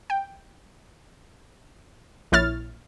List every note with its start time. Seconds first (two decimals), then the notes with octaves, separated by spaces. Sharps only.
0.10 G5
2.32 A#1 A#2 E4 C#5 F6 A6